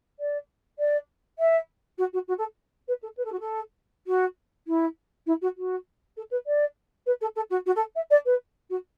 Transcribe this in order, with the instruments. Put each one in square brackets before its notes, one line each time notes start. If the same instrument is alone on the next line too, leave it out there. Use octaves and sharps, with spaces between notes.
[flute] D5
D5
E5
F#4
F#4
F#4
A4
B4
A4
B4
A4
F#4
A4
F#4
E4
E4
F#4
F#4
A4
B4
D5
B4
A4
A4
F#4
F#4
A4
E5
D5
B4
F#4